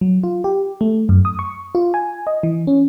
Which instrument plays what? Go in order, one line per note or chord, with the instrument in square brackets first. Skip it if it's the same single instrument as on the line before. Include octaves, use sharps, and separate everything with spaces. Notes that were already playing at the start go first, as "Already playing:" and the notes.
[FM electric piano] F#3
F4
G4
A3
F#2
D#6
C#6
F4
G#5
D#5
E3
C#4